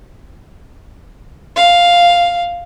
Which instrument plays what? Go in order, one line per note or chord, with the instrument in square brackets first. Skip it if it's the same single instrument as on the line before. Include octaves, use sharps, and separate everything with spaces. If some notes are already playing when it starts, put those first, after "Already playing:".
[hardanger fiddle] F5